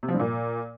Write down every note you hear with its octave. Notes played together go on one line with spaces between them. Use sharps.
C3
F3
G2
A#2